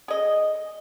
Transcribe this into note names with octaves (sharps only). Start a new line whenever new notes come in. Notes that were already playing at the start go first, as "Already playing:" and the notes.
G#4 D#5